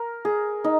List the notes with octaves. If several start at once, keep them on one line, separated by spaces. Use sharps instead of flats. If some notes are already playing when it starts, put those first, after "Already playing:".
Already playing: A#4
G#4
D#4